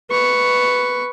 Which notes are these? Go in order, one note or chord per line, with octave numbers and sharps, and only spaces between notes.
B4 C#6